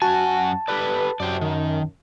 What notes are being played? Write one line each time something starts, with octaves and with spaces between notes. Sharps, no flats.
F#2 F#4 G#5 A5
G4 A4 B4 D5
F#2 G4 C5 D5
D#3